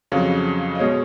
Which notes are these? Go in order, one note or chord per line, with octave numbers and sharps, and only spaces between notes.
F2 C#3 F#3 F5
D#5
B2 G#3 C#5